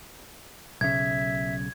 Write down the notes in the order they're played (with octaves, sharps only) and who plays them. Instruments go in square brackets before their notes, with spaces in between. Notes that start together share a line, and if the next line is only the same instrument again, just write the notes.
[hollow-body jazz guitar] B1 C#3 [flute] E5 [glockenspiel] G#6